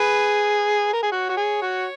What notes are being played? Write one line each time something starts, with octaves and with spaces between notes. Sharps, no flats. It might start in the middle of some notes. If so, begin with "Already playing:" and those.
Already playing: G#4 B4
A#4
G#4
F#4 C#5
F#4
G#4
F#4